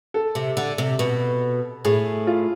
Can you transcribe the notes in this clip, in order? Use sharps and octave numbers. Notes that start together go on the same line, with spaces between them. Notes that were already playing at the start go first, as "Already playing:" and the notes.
A4
C3
D3
C3
B2
A2 G#4
F4